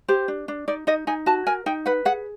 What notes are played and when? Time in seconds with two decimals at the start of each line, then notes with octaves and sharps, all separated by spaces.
0.08 G4 C5
0.28 D4
0.48 D4
0.68 D#4 D5
0.87 D#4 D#5
1.07 D#4 G#5
1.26 F#4 A5
1.47 A#4 G#5
1.66 D#4 G5
1.86 B4 F#5
2.05 G#4 F#5